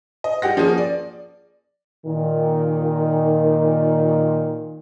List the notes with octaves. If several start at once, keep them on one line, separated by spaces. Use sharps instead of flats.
D#5
G3 G4 F#5 A#6
F3 A#3 C#4 G#4
D5
A#2 D#3